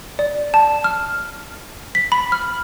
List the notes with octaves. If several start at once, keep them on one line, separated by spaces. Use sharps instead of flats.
D5
A5
F6
B6
B5
F6